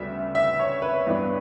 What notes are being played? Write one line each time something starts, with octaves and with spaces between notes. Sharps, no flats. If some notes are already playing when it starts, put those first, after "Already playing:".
Already playing: D2 C#3 G3 B3 D4 E5
E5
C#5
B4
G2 E3 B3 D4